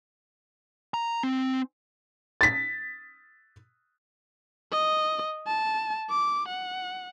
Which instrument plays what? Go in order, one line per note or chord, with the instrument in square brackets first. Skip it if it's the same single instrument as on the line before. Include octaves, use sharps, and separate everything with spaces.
[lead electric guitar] A#5
C4
[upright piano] A6 B6
[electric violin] D#5
A5
D6
F#5